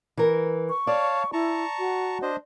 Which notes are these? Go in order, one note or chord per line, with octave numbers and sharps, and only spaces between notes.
E3 A#4
C#6
C#5 D5 F5 A5
E4 A5 A#5 C#6
F#4
D4 C5 D#5